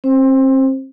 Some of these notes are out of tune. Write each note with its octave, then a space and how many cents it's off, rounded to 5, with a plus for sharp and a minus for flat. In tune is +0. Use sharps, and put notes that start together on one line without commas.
C4 +35 C5 +10